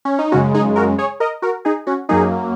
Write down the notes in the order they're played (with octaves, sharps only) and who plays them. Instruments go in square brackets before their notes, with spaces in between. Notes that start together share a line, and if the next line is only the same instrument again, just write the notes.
[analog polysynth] C#4
D#4
F#2 C#3 G#3 C#4 F#4
D#4 G#4
F#4 A#4
G#4 C#5
A#4 D#5
F#4 A#4
D#4 G#4
C#4 F#4
F#2 F#3 A#3 D#4 G#4